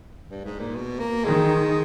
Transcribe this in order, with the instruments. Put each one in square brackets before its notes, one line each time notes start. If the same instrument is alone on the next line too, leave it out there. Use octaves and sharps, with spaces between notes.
[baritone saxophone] G2
G#2
A#2
B2
A#3
[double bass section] D#3 [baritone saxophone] G#3